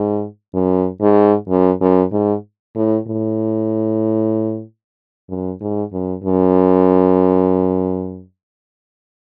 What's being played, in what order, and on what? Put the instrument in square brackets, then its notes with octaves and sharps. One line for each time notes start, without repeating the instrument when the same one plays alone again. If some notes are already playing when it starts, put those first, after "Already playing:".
Already playing: [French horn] G#2
F#2
G#2
F#2
F#2
G#2
A2
A2
F#2
G#2
F#2
F#2